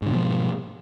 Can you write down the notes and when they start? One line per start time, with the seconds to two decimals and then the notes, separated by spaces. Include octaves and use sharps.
0.02 G#2
0.06 D3
0.11 B2
0.15 F3